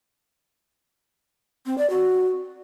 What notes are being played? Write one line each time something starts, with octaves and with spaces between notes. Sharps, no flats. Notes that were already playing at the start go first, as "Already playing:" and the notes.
C4
D5
F#4